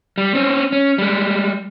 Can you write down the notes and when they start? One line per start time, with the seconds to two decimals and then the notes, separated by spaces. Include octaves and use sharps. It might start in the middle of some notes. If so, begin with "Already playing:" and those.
0.18 G3
0.35 C4 C#4
0.72 C#4
0.98 G3 G#3